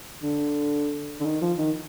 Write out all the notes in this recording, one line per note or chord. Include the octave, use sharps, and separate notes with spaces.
D3
D3
D#3
F3
D#3